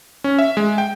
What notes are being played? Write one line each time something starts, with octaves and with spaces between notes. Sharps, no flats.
C#4
E5
G#3
G5